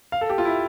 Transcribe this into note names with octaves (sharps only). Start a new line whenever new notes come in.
F5
A4
G4
F4
E4